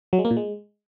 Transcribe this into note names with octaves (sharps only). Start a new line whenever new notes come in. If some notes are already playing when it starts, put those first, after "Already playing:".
F#3
G#3
A#3
A#2
G#3